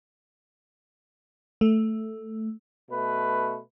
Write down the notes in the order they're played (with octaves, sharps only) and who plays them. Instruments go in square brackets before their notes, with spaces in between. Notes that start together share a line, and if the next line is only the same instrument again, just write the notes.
[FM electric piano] A3
[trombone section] B2 A3 B4